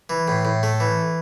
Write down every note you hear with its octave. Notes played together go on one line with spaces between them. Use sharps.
E3
A2
A2
A3
E3